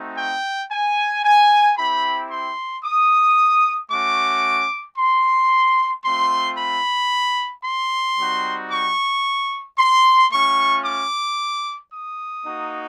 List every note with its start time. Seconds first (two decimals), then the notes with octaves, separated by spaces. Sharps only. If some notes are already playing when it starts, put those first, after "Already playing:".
Already playing: A3 C4 D#4 F#4
0.18 G5
0.71 G#5
1.24 G#5
1.77 C4 E4 G4 B5
2.31 C6
2.84 D#6
3.91 A3 C#4 F#4 D6
4.98 C6
6.05 A3 C4 F4 C6
6.58 B5
7.64 C6
8.18 G3 C4 D#4 F#4
8.72 C#6
9.78 C6
10.32 A3 C#4 F4 C#6
10.85 D6
11.93 D#6
12.45 A#3 D#4 F#4